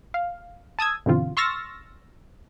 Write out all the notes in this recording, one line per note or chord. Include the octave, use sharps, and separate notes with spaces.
F5
A5 D#6 E6 G#6
G2 B2 D3 E3 C4 F4
C6 C#6 E6 F6 A6 A#6